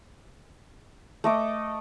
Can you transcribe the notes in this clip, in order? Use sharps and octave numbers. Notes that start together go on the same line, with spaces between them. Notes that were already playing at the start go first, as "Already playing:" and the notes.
A3 D#5 D6